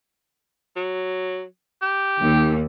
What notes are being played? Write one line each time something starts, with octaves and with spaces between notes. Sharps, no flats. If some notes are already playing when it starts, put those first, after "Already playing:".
F#3
G4
D#2